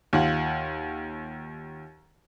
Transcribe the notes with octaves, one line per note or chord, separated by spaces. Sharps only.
D#2 F4 F#5